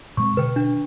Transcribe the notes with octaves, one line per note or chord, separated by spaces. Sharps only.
A#2 G#3 C4 C#6
B2 D3 B4 G5
D4